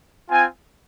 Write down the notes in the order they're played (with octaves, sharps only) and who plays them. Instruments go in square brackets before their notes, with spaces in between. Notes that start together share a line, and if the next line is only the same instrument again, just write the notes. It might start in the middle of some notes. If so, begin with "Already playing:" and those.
[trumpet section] C4 F4 G#5